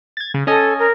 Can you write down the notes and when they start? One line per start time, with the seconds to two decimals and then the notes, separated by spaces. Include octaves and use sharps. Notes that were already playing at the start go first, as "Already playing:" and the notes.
0.17 G#6 A6
0.34 C#3
0.47 C#4 A4 D#5 G#5
0.79 A#4